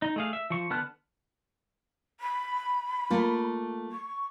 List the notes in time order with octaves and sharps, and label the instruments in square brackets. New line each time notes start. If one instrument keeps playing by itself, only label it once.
[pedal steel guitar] D#4
A3 G#4 F5
E5
F3 C#6
D3 B3 A5 F6 F#6
[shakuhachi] B5
[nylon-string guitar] A3 A#3 F4
[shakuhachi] C#6